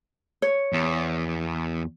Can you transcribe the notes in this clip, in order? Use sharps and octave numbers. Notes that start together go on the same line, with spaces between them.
C#5
E2